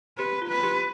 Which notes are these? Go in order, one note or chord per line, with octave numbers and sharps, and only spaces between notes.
G4 B4
F4
B4
G4